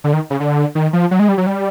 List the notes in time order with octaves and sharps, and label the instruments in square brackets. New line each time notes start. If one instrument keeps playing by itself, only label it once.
[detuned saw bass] D3
D#3
C#3
D3
D#3
F3
F#3
G#3
G3
F#3
G3